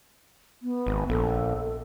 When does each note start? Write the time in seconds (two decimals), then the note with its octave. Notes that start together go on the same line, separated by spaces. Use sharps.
0.63 B3
0.87 G#1
1.10 A#1 A4